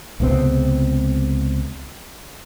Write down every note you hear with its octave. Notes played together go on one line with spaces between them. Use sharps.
C#2 C3 B3 C4